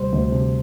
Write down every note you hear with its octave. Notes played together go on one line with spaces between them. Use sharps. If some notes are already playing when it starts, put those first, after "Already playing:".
Already playing: D2 C3 G3 C5
D2
C3